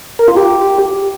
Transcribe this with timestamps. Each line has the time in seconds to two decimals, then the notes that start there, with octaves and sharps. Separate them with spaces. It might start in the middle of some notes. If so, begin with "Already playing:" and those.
0.19 A#4
0.28 F4
0.36 G4